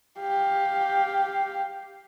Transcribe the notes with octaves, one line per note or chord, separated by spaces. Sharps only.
G4 F5